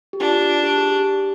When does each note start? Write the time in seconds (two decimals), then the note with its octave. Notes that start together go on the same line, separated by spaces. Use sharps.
0.13 G4
0.20 D4 F4
0.63 G4
0.77 G#4
0.91 G4